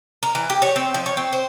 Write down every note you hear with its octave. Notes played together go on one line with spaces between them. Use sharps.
A#4
E3
G4
C#5
C4
F3
C#5
C4
C5